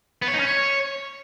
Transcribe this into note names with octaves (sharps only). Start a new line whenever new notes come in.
B3
C#5
D#4
C#4
C#5